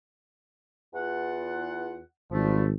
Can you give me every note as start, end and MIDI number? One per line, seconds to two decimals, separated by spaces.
0.94 2.00 40
0.94 2.00 65
0.94 2.00 78
2.31 2.76 32
2.31 2.64 53
2.31 2.64 55
2.31 2.64 57